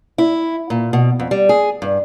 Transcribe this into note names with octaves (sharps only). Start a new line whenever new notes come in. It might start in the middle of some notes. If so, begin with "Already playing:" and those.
E4
A#2
B2
F2
G3
G#4
G2